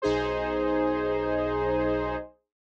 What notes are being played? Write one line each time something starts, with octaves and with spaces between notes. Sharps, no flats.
B1 D#4 G#4 C5